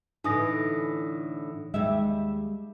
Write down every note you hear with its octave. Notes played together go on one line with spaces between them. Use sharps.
A2 D3 E3 D#4 D#6 A#6
D#2 G3 G#3 E5